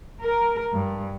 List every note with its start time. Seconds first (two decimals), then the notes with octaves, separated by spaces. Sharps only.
0.23 A#4
0.74 G2